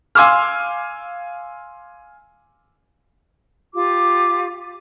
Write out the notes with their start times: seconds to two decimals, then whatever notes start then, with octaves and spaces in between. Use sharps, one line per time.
0.15 F5 G#5 C6 D6 E6 F6
3.74 F4 G4 D6